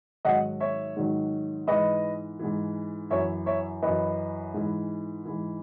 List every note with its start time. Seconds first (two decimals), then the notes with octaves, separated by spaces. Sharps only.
0.25 G#2 D#3 F#3 D#5 F#5
0.60 C#5 E5
0.96 G#2 D#3 F#3
1.67 G#2 E3 B4 D#5
2.39 G#2 E3
3.10 F#2 E3 C#5 E5
3.46 C#5 E5
3.82 F#2 E3 B4 D#5
4.54 G#2 E3
5.25 G#2 E3